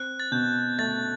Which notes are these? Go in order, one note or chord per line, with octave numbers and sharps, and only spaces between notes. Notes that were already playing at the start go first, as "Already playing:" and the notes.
Already playing: C4 F#6
A6
B2 G6
A3 A6